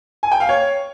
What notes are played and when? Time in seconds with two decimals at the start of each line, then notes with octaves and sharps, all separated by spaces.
0.23 G#5
0.32 G5
0.40 F5
0.49 C#5